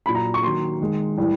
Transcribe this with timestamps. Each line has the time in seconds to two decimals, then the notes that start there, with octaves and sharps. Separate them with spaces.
0.06 A#2 F#3 A#3 B5
0.15 A#5
0.34 C#6
0.43 D#3 F#3 A#3 C6
0.81 D#3 G#3
1.17 A2 E3 G3